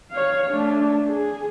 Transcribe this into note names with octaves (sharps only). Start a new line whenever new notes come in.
C#5 F5
A3 D4
G#4